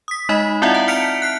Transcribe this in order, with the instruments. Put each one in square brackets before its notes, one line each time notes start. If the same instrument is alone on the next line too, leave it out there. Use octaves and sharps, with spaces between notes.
[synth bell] D#6 B6
G#3 D#4 D#5 B5
C4 E4 F4 D5 E5 F#5
A5
F6 B6 C#7 D7 F7
F#6 C7